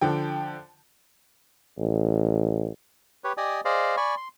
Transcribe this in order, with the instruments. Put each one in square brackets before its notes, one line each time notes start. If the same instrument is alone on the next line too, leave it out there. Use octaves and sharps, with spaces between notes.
[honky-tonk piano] D3 F3 G5
[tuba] A1
[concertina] G4 B4 C#5
G4 D5 D#5 G#5 D#6
G#4 C5 D5 D#5 F5
D5 G#5 B5 C#6
C6